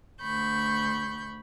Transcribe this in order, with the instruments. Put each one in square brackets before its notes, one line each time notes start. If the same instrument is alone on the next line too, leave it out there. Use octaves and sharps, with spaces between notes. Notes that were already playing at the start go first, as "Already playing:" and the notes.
[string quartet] D2 B5 C#6 G6